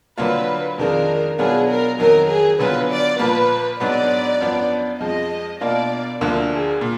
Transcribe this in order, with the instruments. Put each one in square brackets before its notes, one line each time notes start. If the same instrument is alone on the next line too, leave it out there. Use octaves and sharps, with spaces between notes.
[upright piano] D3 F#3 A#3 D4 F4 [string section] B4
[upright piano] F2 D#3 G#3 D4 F4 [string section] A#4
[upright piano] B2 F#3 B3 D4 F4 [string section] G#4
[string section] A#4
[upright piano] F2 D#3 F#3 [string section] A#4
[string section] G#4
[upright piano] D3 F#3 B3 F4 [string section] B4
[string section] D5
[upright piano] A#2 F3 A#3 [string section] B4
[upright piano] G#2 F#3 B3 D4 [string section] D5
[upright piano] F#2 F3 B3 D4
[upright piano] F2 F3 G#3 [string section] D#5
[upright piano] B2 A#3 D4 F4 [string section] D5
[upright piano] D2 D3 F3 A#3 D4 [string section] A#4
[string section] G#4
[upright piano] A#2